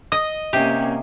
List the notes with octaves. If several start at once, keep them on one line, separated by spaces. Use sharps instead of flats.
D#5 D#6
C3 A#3 C#4 G4